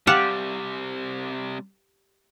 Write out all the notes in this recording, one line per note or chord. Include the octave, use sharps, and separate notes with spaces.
C3 G3 G4 F5 F#5 A5